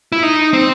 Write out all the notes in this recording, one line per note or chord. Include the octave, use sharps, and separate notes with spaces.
E4
D#4
C4